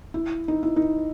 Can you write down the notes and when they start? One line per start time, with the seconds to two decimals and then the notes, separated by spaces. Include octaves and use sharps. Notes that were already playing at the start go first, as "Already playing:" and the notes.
0.14 E4
0.48 D#4
0.63 E4
0.76 D#4